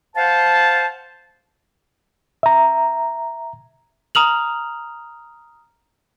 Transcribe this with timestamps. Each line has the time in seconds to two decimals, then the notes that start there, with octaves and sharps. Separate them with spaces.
0.16 C5 F5 F#5 A5
2.43 E5 A#5
4.15 A#5 D#6 F6 F7 F#7